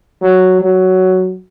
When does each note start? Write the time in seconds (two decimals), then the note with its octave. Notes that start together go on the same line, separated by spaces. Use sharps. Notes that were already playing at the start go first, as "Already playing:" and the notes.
0.22 F#3
0.62 F#3